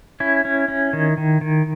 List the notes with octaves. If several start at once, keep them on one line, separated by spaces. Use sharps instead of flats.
C#4 E4
C#4
C#4
D#3
D#3
D#3